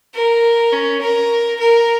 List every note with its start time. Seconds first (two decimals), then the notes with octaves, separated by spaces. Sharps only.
0.14 A#4
0.73 C#4
1.01 A#4
1.60 A#4